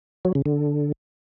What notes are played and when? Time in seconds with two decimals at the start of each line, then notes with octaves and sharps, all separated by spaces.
0.25 F#3
0.35 C#3
0.46 D3